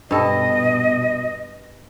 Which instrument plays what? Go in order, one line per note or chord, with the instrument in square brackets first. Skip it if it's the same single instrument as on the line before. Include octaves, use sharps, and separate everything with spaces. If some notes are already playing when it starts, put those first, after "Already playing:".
[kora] G2 A4 [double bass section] B2 [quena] D#5